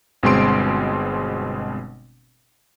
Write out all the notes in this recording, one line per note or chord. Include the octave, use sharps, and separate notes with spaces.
G1 B2 G#3 C4 C6 D7